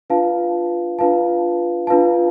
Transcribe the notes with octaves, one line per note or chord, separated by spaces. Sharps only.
D4 F4 B4 F5 A5
D4 F4 B4 F5 A5
D4 F4 B4 F5 A5